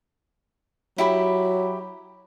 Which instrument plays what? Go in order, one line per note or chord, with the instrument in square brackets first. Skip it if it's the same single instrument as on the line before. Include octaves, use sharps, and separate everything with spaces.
[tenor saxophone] F#3 [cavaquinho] E4 G4 B5